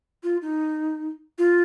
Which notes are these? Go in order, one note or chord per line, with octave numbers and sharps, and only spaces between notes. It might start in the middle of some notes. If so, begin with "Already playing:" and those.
F4
D#4
F4